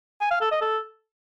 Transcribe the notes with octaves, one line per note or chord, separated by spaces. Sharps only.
G#5
F5
A4
D#5
A4